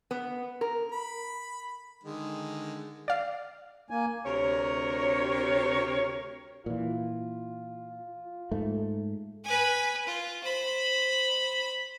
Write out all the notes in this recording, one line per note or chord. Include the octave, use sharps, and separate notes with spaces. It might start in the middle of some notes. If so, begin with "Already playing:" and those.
B3
A#4
B5
D3 D#3 G#3
D5 F5
A#3 G#5
D2 C3 A#4 C#5
A#2 E3 F4
G#2 A3
B4 G#5
F4
C5 B5